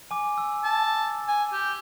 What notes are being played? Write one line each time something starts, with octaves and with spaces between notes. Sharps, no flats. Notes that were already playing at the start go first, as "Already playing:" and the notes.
G#5 D6
E6
A5
G#5
G4